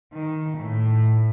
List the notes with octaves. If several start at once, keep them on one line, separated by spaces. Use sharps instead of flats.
D#3
A2